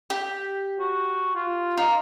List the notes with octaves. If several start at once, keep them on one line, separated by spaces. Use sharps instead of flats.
G4
F#4
F4
D#4 F4